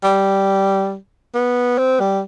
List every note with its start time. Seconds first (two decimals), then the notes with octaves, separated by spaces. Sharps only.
0.03 G3
1.35 B3
1.78 C4
2.00 G3